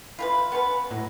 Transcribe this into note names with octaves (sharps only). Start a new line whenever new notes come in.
F4 A#4 B4 B5
B3 C#4 B4
A2 F#3